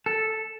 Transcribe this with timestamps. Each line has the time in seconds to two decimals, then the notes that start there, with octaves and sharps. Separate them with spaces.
0.06 A4